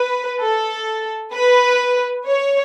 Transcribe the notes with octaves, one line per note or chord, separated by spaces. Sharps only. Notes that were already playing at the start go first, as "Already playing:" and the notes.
Already playing: B4
A4
B4
C#5